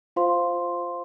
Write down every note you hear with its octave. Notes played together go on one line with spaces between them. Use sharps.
F4 C5 F5 C6